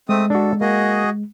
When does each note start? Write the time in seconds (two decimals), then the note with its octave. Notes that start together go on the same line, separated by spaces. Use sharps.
0.09 G#3 A3 C4 D#6
0.30 D4 F#4 A4
0.61 A#3 F#4 G#4 D#5